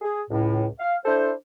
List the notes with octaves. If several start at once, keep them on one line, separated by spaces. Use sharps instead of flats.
G#4
C#2 A2
F5
D4 E4 A4 C5